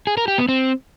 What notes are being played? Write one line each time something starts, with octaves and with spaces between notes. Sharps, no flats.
G#4
A#4
G4
B3
C4